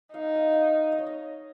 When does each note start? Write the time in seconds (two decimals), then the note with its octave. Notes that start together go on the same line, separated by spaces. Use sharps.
0.13 D#4 F5
0.35 F5
0.52 F5
0.92 D#5
0.99 C#5
1.06 D#5